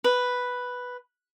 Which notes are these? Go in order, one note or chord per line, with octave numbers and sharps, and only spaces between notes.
B4